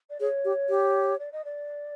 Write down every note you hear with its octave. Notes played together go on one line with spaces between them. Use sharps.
D5
G#4 C#5
G4
G4
D5
D#5
D5